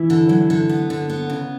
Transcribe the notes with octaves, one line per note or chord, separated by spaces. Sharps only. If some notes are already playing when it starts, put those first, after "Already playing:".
Already playing: E3 E4
D3
F#3
D3
B3
D3
B3
C#3